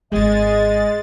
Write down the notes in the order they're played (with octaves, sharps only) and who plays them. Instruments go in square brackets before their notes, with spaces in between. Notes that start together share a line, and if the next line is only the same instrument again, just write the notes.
[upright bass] D1 G#1 [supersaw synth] G#3 A6 [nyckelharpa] G#4 [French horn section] D#5